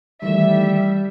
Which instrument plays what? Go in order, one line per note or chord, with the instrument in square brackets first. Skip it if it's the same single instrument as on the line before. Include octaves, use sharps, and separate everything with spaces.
[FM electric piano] D#3 E3 A3 [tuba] G3 [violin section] E5